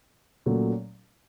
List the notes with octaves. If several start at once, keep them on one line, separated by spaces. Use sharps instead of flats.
A#2 F#3 A3 C#4